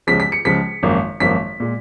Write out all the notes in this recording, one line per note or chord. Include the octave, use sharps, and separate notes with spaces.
C#2 C#3 F3 B6
B6
C#7
C#2 C#3 F3 B6
G#1 F#2 F3 A#3
G#1 F#2 F3 A#3 B6
A#2 G#3